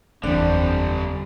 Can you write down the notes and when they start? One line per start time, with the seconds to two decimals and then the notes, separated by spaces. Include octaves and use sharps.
0.23 F#1 E2 D3 G3 C4 D4